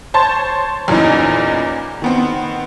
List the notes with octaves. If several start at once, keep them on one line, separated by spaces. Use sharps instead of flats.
C5 C#5 A5 C6 A6
E2 A#2 C#3 E3 D#4
D#3 B3 C4